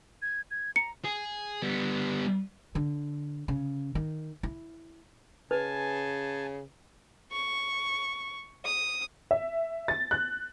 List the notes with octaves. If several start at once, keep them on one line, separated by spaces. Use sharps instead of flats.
G#6
G#6
A#5 C#7
G#4
G3 B3
D3
C#3
D#3
E4
C#3 B4 G#5 A5
C#6
D#6
E5
A6
F#6